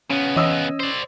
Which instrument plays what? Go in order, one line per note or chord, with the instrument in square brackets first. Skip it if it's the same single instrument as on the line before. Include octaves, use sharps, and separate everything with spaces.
[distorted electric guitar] C#3 B3 [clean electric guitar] C#4
[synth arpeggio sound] E3 C#5 [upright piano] D#5 D#6 E6
[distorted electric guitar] C5 D5